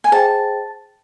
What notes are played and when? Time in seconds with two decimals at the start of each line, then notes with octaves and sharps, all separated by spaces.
0.04 G#5
0.12 G#4 C5 D#5 G5 A5